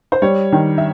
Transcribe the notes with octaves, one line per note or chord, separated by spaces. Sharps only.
C5
G3 C#5
D#3
E5